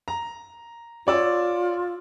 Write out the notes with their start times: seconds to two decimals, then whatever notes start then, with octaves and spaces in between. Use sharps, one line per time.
0.08 A#5
1.07 F4 C#5 D5 E6